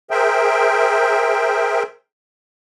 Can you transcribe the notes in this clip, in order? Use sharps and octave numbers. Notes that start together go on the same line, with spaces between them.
G#4 A#4 C5 E5 G5